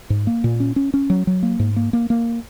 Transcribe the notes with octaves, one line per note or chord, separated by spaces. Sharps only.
G#2
A#3
A#2
C#4
C#4
C#4
F#3
F#3
A#3
G#2
A#3
A#3
A#3